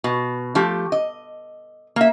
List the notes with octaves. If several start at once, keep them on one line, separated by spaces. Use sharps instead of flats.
B2
F3 A3 G4
D#5
A#3 E5